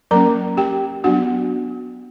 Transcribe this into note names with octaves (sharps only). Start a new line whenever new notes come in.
F#3 A#3 C#4 A#4 A#5
G4 G5
F#3 B3 D4 F#4 F#5